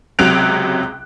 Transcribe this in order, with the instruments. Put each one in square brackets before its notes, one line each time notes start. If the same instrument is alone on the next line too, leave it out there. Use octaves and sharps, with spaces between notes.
[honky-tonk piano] C#2 C3 F#3 F#6 D7 F7